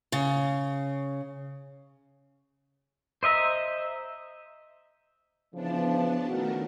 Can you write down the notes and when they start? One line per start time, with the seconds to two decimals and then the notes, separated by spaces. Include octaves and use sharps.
0.12 C#3
3.23 C5 D#5 E5 A#5
5.54 C#3 E3 F3 B3 D4 A5
6.25 B2 D#3 A3 C#4 F#4 A#4